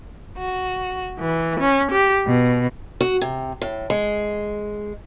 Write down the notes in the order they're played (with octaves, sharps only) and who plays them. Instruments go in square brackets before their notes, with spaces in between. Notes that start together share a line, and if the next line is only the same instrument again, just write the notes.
[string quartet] F#4
E3
C#4
G4
B2
[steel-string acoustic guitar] F#4
C3
A2
G#3